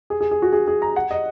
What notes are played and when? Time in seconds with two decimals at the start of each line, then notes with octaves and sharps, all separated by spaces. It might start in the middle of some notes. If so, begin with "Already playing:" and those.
0.10 G#4
0.21 G#4
0.31 G#4
0.42 F#4
0.53 G#4
0.68 G#4
0.82 A#5
0.96 F#5
1.11 D#5